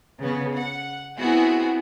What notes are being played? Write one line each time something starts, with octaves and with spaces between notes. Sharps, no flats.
C#3 B3
F#5
B3 C4 E4 F#4 G#4